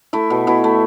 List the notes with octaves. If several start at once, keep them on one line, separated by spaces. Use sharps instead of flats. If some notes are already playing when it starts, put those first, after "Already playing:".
A3 E4
B2
B2 E4
A3